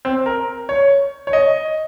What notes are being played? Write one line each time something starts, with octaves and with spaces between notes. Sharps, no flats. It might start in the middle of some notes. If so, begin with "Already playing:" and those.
C4
A#4
C#5
C#5
D#5